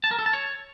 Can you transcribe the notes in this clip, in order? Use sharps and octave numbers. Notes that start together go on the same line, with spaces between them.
A5
A#4
A4
A5
C#5